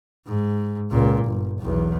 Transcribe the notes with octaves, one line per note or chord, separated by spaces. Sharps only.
G#2
C#2 A#2
G1
B1 E2